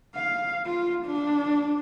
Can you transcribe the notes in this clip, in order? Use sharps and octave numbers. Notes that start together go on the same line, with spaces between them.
F5
F4
D4